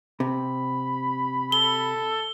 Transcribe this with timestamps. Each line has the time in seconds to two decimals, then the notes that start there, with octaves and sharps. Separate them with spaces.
0.20 C3 B5
1.52 A4 G7